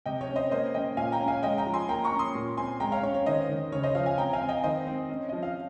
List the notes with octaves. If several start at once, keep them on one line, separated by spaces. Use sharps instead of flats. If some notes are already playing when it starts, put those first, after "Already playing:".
C3 D#5 G5
C#5
C#4
C5 D#5
A#3 C5 D#5
C#4 D#5 G5
A#2 F5 G#5
G5 A#5
C#4
F5 G#5
G#3 D#5 G5
G5 A#5
F3
G#5 C6
A#3 G5 A#5
A#5 C#6
C#4
C6 D#6
A#2
C4 G#5 C6
G#3 G5 A#5
C#5 F5
C#4 C#5
C#5
D#3 C5 D#5
D#3
C#3 C#5
C5 D#5
F3 C#5 F5
F5 G#5
C4 G5 A#5
F5 G#5
C4
D#5 G5
D#3 C5 D#5
C4
C#4
F3 D#5
F5